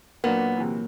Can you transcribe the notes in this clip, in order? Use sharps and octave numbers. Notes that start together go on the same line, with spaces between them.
A#2 F#3 A#3 B3 D4
C3 E3